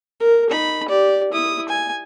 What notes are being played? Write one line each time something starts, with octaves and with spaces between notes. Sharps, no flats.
A#4
D#4 B5
G4 D5
E4 D#6
G#5